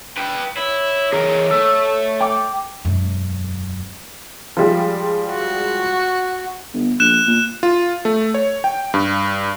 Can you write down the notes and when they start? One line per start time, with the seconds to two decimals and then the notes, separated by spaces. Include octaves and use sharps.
0.17 B4 G5
0.57 E4 C#5
1.13 E3 G#4 A#4
1.51 A3 E6
2.21 G5 D6
2.85 E1 F#2
4.57 F3 G3 G#3
5.30 F#4
6.74 G1
7.00 A#1 F#6 E7
7.27 A#2
7.63 F4
8.05 A3
8.34 C#5
8.64 G5
8.94 G2